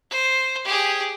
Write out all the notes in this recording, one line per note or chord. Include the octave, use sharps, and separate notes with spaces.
C5
G4 G#4